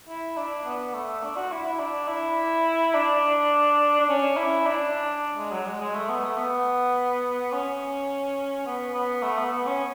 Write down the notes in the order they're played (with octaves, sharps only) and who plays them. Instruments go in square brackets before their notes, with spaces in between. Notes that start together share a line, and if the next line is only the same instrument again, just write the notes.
[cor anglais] E4
D4
B3
A3
D4
F#4
E4
E4
D4
E4
D4
D4
C#4
E4
D4
G#3
F#3
G#3
G#3
A3
B3
A3
B3
C#4
B3
B3
A3
B3
B3
C#4